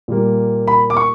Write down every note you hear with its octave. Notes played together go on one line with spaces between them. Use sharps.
A#2 G3 A#3
B5
D6
C#6